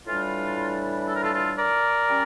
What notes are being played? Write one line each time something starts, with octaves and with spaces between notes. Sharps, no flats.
A2 E3 G3 D4 F4
A4
A#4
F4 A4
F4 A4
A#4 D5
G3 C#4